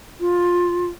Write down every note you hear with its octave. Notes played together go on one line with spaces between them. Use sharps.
F4